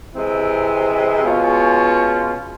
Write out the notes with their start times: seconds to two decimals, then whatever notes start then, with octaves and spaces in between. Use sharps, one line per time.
0.14 C3 E3 G#3 C4 E4
1.24 B2 G#3 C#4 F4